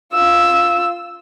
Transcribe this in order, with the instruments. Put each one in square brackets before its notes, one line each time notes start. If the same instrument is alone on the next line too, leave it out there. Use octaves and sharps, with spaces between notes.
[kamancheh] F4 E6